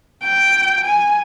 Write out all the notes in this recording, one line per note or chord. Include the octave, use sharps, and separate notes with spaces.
G5
G#5